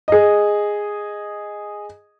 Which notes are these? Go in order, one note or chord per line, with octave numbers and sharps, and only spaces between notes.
G#4 D#5